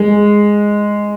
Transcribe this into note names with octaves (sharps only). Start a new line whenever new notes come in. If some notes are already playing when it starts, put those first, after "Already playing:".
Already playing: G#3